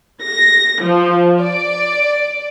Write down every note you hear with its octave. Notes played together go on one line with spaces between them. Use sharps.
A#6
F3
D5